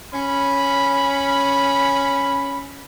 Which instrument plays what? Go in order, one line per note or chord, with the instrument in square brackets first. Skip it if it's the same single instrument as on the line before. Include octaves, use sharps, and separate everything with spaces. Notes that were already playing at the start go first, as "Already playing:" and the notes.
[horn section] C#4 B5